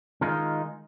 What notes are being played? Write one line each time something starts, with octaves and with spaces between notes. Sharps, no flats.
D#3 G#3 D#4 F4